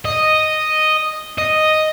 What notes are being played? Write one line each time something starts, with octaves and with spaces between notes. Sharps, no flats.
D#5
D#5